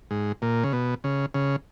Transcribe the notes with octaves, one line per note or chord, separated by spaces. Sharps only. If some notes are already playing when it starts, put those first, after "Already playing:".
G#2
A#2
C#3
B2
C#3
C#3